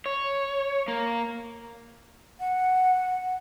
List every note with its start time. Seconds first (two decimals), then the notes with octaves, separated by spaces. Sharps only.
0.06 C#5
0.88 A#3
2.40 F#5